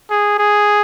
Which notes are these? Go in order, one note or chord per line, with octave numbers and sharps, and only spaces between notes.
G#4
G#4